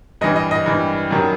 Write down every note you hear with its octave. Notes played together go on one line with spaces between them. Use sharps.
G2 E3 G3 D#5
D#5
D#5
G2 E3 G3
F#2 D#3 G3